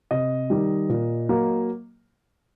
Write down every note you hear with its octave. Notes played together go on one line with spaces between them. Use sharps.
C3 D#5
D#3 G3
A#2
F#3 A#3